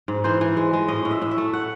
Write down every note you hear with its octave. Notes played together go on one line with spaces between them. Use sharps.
G#2
E3 C5
E3
G#3
G#3
A2 D#5
A2
E5
A2
E5
A3
F#5